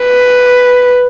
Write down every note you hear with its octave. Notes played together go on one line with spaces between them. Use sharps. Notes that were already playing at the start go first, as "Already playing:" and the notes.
Already playing: B4